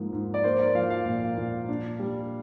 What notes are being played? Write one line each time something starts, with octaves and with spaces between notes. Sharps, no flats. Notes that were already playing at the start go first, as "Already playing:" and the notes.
Already playing: G#2 F3 A#3
G#2
D5
A#3 C5
D5
F3 F5
F5
A#2
A#2
D4
G3